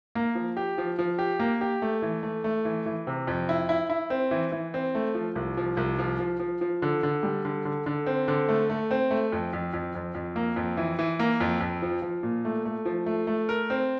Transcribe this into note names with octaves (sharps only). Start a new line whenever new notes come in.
A#3
F3
G4
F3
F3
G4
A#3
G4
A3
E3
A3
A3
E3
E3
C3
F2
E4
E4
E4
C4
E3
E3
C4
A3
F3
C2
F3
C2
F3
F3
F3
F3
D3
D3
G3
D3
D3
D3
C4
D3
A3
A3
C4
A3
F2
F2
F2
F2
F2
A#3
F2
E3
E3
A#3
F2
F2
F3
F3
A#2
A3
A3
F3
A3
A3
A#4
C4